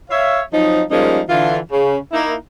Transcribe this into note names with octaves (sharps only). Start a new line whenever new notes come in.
C#5 E5 F5
F3 F#3 C4 D#4
F3 G3 G#3 A#3 C#4 D#4
D3 E3 F4
C#3
A#3 D#4 E4